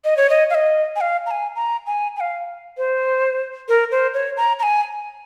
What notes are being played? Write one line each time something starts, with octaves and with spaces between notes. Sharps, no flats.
D#5
C#5
D#5
F5
D#5
G#5
F5
A#5
G#5
A#5
G#5
G#5
F5
C5
A#4
C5
C#5
A#5
A#5
G#5